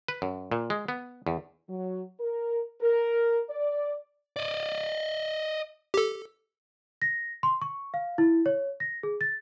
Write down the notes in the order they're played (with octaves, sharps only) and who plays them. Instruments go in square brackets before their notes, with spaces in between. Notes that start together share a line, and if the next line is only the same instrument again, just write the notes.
[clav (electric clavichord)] B4
F#2
A#2
G#3
B3
E2
[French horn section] F#3
A#4
A#4
D5
[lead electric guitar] D5 D#5
[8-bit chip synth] G4 A4
[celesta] A#6
C6
C#6
F5
E4
C#5
A#6
G#4
A6